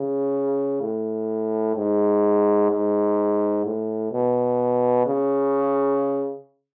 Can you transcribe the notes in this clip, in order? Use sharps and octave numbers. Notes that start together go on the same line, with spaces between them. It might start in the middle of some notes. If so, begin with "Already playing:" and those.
Already playing: C#3
A2
G#2
G#2
A2
B2
C#3